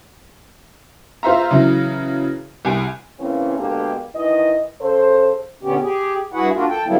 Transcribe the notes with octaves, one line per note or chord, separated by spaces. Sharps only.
F4 C5 E5 A#5
C#3 E3 F#3
C2 G#5 D7
C#3 E3 A#3 C4 C#4
B2 D3 G#3 A#3 G4
D#3 E3 D#5
C#3 A4 C5
A#2 D3 B3 C#4 G4
G4 G#4
G2 E4 F#4 G#4 B4 F#5
A#3 D4 F4 F#4
A4 G5
D3 F#3 G3 A#3 B3 E4